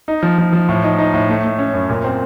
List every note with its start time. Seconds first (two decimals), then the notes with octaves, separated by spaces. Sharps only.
0.08 D#4
0.23 F3
0.38 F3
0.53 F3
0.69 A2
0.83 D#4
0.98 D#4
1.14 A2
1.29 A3
1.44 A3
1.59 C#4
1.73 F#2
1.89 A#2
2.04 C4